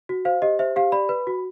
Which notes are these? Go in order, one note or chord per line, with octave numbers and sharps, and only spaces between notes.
F#4
C5 F5
G4 D#5
C5 E5
G4 F5
D5 B5
B4
F#4